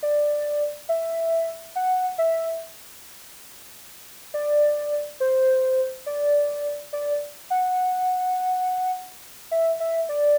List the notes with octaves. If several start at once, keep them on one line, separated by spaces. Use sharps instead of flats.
D5
E5
F#5
E5
D5
C5
D5
D5
F#5
E5
E5
D5